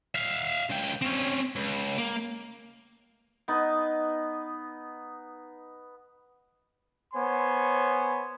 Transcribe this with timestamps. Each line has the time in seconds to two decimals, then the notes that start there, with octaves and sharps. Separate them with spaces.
0.15 E5 F5
0.69 C#2 G5
1.02 C4 C#4
1.55 C#2
1.98 A#3
3.48 B3 D#4
7.14 B3 C5 C#5 G#5 C6